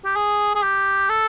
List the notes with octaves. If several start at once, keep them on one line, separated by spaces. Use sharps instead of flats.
G4
G#4
G#4
G4
A4